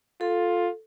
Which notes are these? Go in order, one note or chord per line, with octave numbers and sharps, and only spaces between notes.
F4 A4